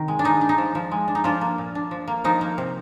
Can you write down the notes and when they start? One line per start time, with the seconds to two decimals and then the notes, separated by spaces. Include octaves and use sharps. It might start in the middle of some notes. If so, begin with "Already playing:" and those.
Already playing: C3 D#3
0.08 G#3
0.19 D4
0.24 G#3 D#4
0.41 D4
0.49 D#4
0.58 F3
0.75 F3
0.91 G#3
1.08 D4
1.15 D#4
1.24 F3 D4 F4
1.41 A#3
1.58 A#2
1.75 D4
1.91 F3
2.08 A#3
2.24 F3 D#4
2.41 A#3
2.58 C3